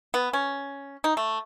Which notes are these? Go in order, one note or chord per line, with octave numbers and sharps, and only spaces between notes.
B3
C#4
D#4
A3